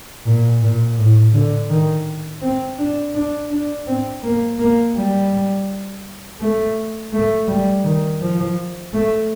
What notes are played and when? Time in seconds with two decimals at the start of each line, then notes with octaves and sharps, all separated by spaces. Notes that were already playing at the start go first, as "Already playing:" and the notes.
0.26 A#2
0.61 A#2
0.98 A2
1.34 D3
1.70 D#3
2.41 C4
2.78 D4
3.15 D4
3.51 D4
3.87 C4
4.23 A#3
4.59 A#3
4.95 G3
6.40 A3
7.13 A3
7.48 G3
7.84 D#3
8.21 F3
8.93 A3